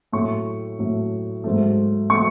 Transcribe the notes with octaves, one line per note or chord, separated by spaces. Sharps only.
A2 F#3 A3 C#6
A2 F#3 A3
G#2 F#3 A3
F#3 A3 C#6